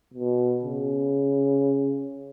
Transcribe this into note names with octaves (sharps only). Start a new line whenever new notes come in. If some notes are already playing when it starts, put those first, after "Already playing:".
B2
C#3